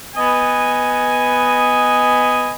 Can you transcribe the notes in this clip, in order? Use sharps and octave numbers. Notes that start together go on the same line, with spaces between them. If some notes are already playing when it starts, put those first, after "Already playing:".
B3 D#5 G#5